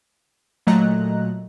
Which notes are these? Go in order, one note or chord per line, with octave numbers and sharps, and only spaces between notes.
A#2 F#3 A3 D#5 A#5 F#6